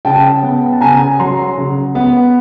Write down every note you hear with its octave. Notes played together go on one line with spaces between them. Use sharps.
C#3 G5 A5
B3
A5
C#3 G#5 A#5
F#3 A#5 C6
C#3
B3